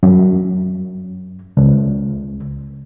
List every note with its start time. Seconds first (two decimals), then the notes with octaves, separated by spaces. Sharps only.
0.03 F#2
1.57 C#2